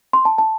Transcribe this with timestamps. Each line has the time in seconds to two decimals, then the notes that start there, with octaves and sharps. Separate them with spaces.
0.13 C6
0.25 A5
0.38 A5